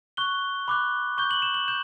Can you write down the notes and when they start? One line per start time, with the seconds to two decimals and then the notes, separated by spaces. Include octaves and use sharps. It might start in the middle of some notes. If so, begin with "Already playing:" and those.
0.17 C#6 F#6 G7
0.68 B5 D6 F#6
1.18 C#6 G6 G7
1.31 F#7
1.42 E7
1.54 F#7
1.68 G6 E7